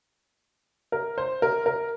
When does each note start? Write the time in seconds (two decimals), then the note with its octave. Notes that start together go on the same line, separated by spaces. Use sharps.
0.92 A#4
1.18 C5
1.42 A#4
1.66 A#4